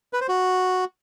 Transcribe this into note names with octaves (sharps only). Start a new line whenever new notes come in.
B4
C5
F#4